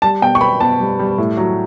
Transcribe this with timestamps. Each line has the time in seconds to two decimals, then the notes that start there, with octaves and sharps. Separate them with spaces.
0.02 G3 A5
0.22 B2 G5
0.35 C#6
0.41 B3 B5
0.60 B2 A5
0.80 G3
0.99 G3
1.18 A2
1.37 F#3